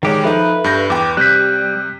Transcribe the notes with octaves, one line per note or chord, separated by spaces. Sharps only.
D#3 G3 G#3 G4 C#5
F3 D#4 A4 B4 E5
G2 G6 A#6
E2 G5 D6
C3 G3 F#6 G6 B6